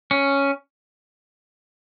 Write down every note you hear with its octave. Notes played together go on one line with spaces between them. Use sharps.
C#4